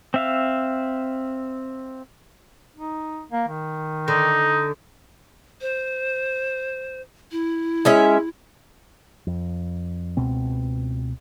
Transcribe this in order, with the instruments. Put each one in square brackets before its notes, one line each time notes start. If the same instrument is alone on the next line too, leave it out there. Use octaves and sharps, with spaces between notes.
[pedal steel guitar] C4 E5 F5
[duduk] D#4
A#3
D#3
[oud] D3 [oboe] D#4
[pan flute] C5
E4
[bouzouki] G#3 C#4 E5
[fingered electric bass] F2
C#2 B2 C4